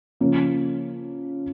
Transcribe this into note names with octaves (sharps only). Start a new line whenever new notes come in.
C#3 F3 A#3 C#4